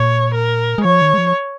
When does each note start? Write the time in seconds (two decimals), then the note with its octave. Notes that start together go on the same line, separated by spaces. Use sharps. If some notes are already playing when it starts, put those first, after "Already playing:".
Already playing: A#2 C#5
0.34 A#4
0.78 G#3
0.84 F3 C#5
1.02 D#3
1.14 G#3
1.18 F3